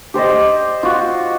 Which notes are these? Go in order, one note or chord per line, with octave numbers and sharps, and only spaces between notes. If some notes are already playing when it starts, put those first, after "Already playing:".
G4 C5 D5 D#5
F4 F#4